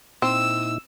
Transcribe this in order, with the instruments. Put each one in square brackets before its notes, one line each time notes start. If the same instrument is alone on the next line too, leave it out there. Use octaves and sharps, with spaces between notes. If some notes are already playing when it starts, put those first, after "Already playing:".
[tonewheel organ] A#2 D#4 E4 [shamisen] C4 [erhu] E6